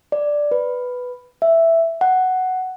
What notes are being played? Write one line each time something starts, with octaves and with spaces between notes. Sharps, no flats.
D5
B4
E5
F#5